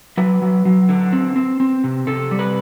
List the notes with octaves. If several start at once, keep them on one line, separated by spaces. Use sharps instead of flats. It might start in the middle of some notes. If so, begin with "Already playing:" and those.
F#3 B4
F#3
F#3
D3
C4
C4
C4
C3
C3 A4
G3
B4